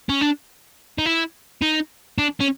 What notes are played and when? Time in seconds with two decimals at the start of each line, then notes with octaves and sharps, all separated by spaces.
0.09 C#4
0.21 D4
0.98 D#4
1.06 E4
1.62 D#4
2.18 D4
2.40 C#4